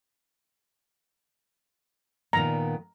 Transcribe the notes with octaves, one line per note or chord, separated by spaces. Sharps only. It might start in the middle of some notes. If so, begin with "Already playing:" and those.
A#2 D#3 B3 A#5